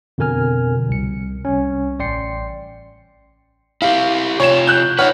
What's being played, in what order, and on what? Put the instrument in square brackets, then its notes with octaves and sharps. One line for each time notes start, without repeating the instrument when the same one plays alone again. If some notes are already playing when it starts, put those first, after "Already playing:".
[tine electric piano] F2 B2 D3 A#4 G#5 F6
C2 C#7
C2 C#4
A1 D5 G5 C6 C7 C#7
[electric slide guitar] E4 G4 [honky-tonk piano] F5
[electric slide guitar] C3 F4 [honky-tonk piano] C#5 E7
[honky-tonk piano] F#6 G6
[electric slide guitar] D#4 B4 [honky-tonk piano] C#5 F#5 F6